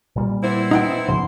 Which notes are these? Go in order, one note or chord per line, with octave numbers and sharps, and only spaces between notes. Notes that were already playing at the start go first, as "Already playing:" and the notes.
A#2 G3 A#3
B3 C4 E4 C5
D#4 F#5 G5
G#2 C#3 F3 C6